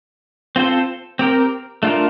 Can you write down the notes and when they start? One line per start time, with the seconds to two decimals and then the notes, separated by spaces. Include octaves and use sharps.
0.56 C4 F4 A4 C5
1.19 C4 G4 A#4
1.83 A3 D4 F4 A#4